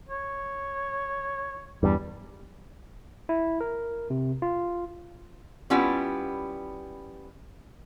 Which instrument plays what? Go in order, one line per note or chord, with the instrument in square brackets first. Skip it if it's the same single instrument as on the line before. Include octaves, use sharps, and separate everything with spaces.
[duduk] C#5
[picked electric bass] E2 G2 [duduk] G3
[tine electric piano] E4
A#4
C3
F4
[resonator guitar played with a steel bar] G3 B3 C#4 E4 F4